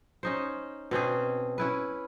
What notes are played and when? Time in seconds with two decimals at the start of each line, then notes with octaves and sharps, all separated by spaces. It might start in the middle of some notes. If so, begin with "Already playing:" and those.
0.23 C#4 D#4 C5
0.91 B2 C4 C#4 G#4
1.58 C#4 E4 B4